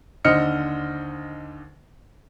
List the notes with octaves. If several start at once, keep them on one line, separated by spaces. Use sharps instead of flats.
D#2 D3 C5 D#5 F6 C#7